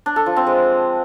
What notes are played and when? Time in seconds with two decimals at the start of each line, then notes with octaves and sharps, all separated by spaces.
0.06 D4
0.16 A4
0.26 F3
0.36 C4
0.47 G#3